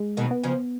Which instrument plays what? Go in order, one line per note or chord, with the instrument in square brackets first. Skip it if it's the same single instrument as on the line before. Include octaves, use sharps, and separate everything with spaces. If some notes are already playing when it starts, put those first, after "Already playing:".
Already playing: [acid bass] G#3
[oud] B2 D#3
[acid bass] B3
[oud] C#3 F3